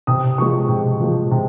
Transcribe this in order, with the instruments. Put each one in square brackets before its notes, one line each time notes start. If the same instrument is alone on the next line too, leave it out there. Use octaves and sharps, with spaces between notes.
[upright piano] C3 D#6
F3 G#3 C#6
C3
F3 G#3
C3